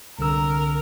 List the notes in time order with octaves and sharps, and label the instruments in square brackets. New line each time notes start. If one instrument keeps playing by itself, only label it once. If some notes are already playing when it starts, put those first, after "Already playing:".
[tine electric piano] C2 D3 E6 [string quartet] A#4